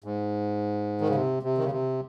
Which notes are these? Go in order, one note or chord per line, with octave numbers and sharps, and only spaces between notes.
G#2
D#3
C#3
C3
C3
D#3
C#3
C3